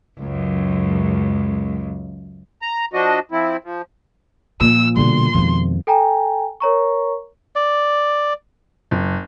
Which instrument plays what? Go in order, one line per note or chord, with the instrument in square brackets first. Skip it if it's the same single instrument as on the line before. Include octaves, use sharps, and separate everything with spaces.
[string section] C#2 F#2
[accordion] A#5
F3 D4 F#4 D#5
F3 C4 E4
F3
[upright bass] A#2 F3 [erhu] E6
[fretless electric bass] B2 D3 G3 [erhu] C6
[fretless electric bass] F2 D#3 F3 [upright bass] B2 G#3
[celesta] A4 G5 G#5 A#5
A#4 C#5 A#5 C#6
[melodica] D5
[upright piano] F#1